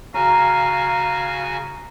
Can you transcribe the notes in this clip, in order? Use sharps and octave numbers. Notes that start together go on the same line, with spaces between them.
C#3 F#4 F5 G#5 A#5